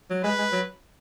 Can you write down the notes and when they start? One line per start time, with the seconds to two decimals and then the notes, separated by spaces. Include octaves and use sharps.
0.10 F#3
0.24 G#3 B4
0.39 G#3
0.52 F#3